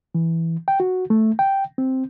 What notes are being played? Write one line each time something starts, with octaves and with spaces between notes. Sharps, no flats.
E3
G5
F#4
A3
G5
C4